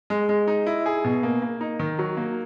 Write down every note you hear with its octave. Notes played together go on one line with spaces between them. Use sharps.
G#3
G#3
D#4
E4
G#4
B2
A#3
A#3
D#4
D#3
F#3
A#3